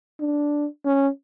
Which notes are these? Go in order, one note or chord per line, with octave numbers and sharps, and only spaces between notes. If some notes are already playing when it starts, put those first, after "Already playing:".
D4
C#4